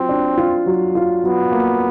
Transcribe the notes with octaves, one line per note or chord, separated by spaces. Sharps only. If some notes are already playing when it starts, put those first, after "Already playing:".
Already playing: F#3 C4 F4
D4
F4
F#3
F4
F#3 B3
A#3